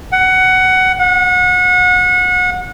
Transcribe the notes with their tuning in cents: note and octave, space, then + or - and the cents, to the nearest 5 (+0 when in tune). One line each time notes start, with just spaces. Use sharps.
F#5 +15
F#5 -30